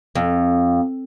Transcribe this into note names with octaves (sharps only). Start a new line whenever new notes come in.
F2